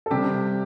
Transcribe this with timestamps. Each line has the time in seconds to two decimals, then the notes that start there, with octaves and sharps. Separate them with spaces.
0.06 A4
0.11 C3 G3 G4